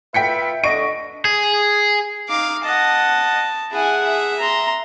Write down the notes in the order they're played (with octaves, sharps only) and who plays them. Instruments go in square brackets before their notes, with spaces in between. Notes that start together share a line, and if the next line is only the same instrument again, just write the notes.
[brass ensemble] F4 B4 E5 [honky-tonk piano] G5 B6 C#7
[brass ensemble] D3 [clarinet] D#5 [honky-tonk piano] C#6 D7
[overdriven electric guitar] G#4
[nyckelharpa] D#4 D6 [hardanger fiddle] F5
[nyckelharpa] D#5 F#5 [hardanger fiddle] A5
[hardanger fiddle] E4 G#5 [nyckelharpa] G#4 F#5
[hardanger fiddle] E5
[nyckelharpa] A#5 C6